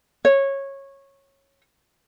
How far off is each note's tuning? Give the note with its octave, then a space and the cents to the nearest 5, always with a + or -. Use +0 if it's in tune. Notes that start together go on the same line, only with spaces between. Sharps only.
C#5 -15